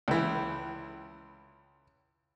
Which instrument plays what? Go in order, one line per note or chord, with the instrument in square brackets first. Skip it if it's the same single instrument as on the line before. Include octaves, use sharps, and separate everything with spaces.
[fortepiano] C#2 E3